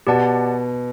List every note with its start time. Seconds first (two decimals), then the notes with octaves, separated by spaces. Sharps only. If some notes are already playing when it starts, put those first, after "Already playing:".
0.07 B2 G4 D5 F#5 A5